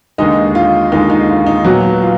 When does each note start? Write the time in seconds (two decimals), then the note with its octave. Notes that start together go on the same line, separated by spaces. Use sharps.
0.18 D#2 D3 G#3 D#4 D#5
0.55 F4
0.92 D#2 D3 G#3 D#4
1.10 D#4
1.29 F4
1.46 D#4
1.65 A#2 F#3 B3 F#4
2.02 F4